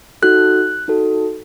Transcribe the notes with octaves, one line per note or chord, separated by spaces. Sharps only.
D#4 F#4 A4 F#6
D#4 F#4 A4